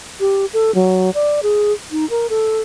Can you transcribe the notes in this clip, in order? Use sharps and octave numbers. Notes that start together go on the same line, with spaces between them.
G4
A4
F#3
D5
G#4
D#4
A#4
A4